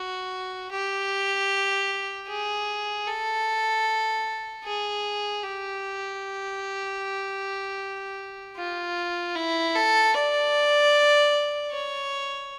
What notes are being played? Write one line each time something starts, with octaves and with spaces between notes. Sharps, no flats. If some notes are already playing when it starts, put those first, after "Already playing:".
Already playing: F#4
G4
G#4
A4
G#4
G4
F4
E4
A4
D5
C#5